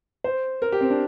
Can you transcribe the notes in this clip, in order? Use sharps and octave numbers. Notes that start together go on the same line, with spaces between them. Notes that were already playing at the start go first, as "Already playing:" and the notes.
C5
A#4
G4
C4
D4